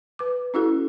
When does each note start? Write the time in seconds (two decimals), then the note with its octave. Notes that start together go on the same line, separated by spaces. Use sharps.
0.19 B4 D6
0.54 C#4 E4 F#4 A4